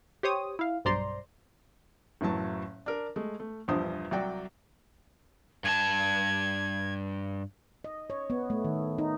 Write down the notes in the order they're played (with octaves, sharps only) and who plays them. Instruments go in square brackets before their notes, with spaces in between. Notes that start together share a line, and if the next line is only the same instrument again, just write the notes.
[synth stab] G4 C5 C#5 D#6
E4 F5
B1 G2 C5 D5 A#5 C6
[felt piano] F#1 A2 E3 F#3 A5
D4 A#4
G#3 A3
A3
A#1 E2 G2 F3 C5 D#6
C2 F#3 F#4 D5 G5
[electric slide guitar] G2 G#4 A5 [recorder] G#6
[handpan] D#5
C#5
B3
A3
D#3
D#4